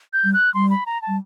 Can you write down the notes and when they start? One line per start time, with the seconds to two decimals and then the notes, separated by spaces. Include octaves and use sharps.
0.13 G6
0.24 G3
0.34 F#6
0.54 G3 C6
0.70 B5
0.86 A#5
1.02 A5
1.08 G3